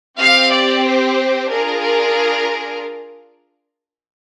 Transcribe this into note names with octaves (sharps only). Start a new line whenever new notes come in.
C4 G4 F5
D5
C5
D4 F4 G#4 A#4
A#4